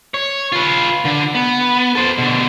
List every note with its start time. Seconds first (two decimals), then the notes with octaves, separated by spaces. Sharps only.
0.14 C#5
0.52 F4 B4
1.05 D3
1.34 B3
1.95 A4 C5
2.18 B2 D3